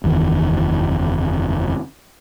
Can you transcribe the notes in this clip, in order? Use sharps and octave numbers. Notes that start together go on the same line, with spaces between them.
F#1 E2 D#3